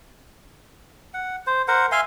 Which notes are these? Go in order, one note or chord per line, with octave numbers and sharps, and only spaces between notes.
F#5
C5
A#4 C5 F#5
E5 F5 G#5 C6